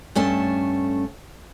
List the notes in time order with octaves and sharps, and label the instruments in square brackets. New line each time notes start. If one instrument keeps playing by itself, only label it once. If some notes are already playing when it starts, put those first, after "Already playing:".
[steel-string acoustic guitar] G2 A3 C#4 A5